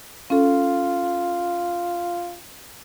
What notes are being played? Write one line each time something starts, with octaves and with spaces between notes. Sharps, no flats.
C#4 F4 A4